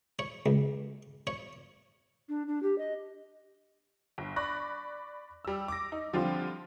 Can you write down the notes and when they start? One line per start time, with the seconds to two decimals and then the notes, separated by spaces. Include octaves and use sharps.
0.19 C#5
0.46 C#2
1.27 C#5
2.29 D4
2.48 D4
2.63 G4
2.78 D#5
4.18 G1
4.36 D5 B5 C#6 F#6 A#6
5.45 G3 E6
5.68 D6 A#6
5.92 D#4
6.13 D3 F3 G3 C4 F4